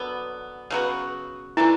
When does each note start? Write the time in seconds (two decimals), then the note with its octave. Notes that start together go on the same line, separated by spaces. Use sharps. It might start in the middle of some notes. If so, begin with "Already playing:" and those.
Already playing: D3 F#3 B3
0.70 C#3 F#3 B3 F#4
1.57 E3 A3 D4 E4